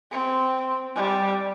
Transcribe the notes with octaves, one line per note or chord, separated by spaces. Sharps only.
C4
G3